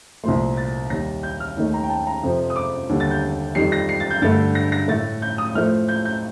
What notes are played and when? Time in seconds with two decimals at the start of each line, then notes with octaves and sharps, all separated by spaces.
0.23 C2 A#2 F3 A3 C6
0.57 A6
0.90 D#2 D#3 G3 A#6
1.23 G6
1.40 F6
1.57 D#2 D#3 A3
1.74 A#5
1.83 G5
1.90 A5
2.07 A#5
2.23 F2 C3 F3
2.50 D#6
2.56 D6
2.89 D#2 D3 G3
3.00 A6
3.11 G6
3.55 F2 D#3 G3 C7
3.72 A#6
3.89 C7
4.00 A6
4.10 G6
4.22 G2 D3 A3 A6
4.55 A#6
4.72 A#6
4.88 A2 A3 A6
5.22 G6
5.38 D#6
5.55 A2 F3 A3 F6
5.88 G6
6.05 G6